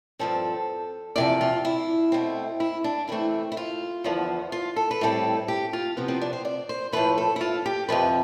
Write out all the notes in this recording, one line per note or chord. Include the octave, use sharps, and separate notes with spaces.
G2 F3 C4 A4
E2 C3 F3 D5
F4
E4
B2 A3 C4
E4
D4
C3 E3 A3 C4 E4
E4
F4
E2 D3 F3 B3
F4
A4
B4
A2 G3 C4 A4
G4
F4
C3 F3 B3
C4
D4
C5
D5
C5
A2 F3 A3 B4
A4
E4
F4
G4
F2 C3 F3 B4